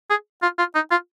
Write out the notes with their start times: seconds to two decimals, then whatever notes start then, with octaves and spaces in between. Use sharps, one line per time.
0.10 G#4
0.42 F4
0.58 F4
0.75 D#4
0.91 F4